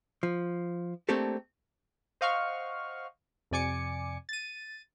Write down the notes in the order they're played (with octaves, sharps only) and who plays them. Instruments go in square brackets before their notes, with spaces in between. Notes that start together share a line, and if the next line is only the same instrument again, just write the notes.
[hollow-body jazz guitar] F3
A3 A#3 C4 D4 G4 A4
[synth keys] C5 D#5 F5 F#5 C#6 F6
F2 C3 D5 G#5 D6 C#7
A6 D#7